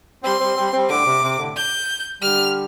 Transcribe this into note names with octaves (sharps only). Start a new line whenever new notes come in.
G3 C4 C6
G3 C4
G3 C4
G3 C4
A2 D3 D6
C3
C3
A2 D3
G6
D3 G3 F6